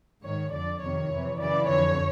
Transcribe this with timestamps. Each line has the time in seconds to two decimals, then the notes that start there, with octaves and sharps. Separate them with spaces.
0.24 G#2 D#3 C#5
0.52 F2 D3 D5
0.81 F2 C3 D#3 C#5
1.10 F2 C3 E3
1.39 F#2 C#3 E3 D5
1.68 F2 D3 C#5